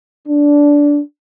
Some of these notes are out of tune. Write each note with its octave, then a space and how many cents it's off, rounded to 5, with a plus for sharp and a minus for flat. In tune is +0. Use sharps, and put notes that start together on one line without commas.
D4 -15